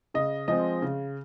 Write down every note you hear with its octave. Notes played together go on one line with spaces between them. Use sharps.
C#3 D#5
F3 G#3 C4 D#5
C#3